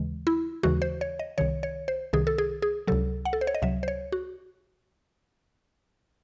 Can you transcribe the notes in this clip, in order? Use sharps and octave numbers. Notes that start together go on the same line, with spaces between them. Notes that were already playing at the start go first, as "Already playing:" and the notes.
Already playing: D#2 C#3 E3 G#3
E4
D#2 C#3 E3 G#3 F#4
C5
C#5
D#5
C2 C3 D#3 C#5
C#5
C5
C2 C3 D#3 G#4
A4
G#4
G#4
C#2 C3 F#3 A4
F#5
A4
C5
C#5
D#5
C#2 C3 F#3 E5
C5
C#5
F#4